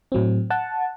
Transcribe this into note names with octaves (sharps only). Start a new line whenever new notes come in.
A2 F#3 C4
F#5 A5